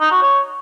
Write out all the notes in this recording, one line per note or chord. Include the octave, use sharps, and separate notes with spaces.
D#4
F#4
C#5